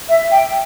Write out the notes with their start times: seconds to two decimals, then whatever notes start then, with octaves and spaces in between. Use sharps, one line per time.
0.09 E5
0.31 G5